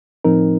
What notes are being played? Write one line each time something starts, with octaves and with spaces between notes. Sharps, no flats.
A2 F3 C4 D#4 A#4